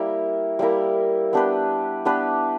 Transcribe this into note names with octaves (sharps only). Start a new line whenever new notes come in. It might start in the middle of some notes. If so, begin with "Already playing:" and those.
Already playing: G3 A#3 E4 A#4
G3 A#3 E4 A#4
B3 D4 G4 B4
B3 D4 G4 B4